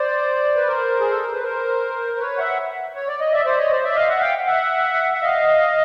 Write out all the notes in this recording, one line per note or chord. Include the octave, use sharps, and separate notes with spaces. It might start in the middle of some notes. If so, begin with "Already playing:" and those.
Already playing: C5 D5
B4
A#4 C5
G#4
A4
A#4
B4
A#4 C5
C5
B4 C#5
E5 F#5
C#5
D5
D#5
D5 E5
C5 D5
C#5 D#5
C5 D5
D5 E5
D#5 F5
E5 F#5
F5 G5
E5 F#5
F#5
D#5 F5